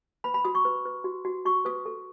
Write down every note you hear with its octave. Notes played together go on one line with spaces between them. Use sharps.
B4 B5
B5
F#4 D#6
C#6
B4
B4
F#4
F#4
F#4 C#6
B4 D#6
A4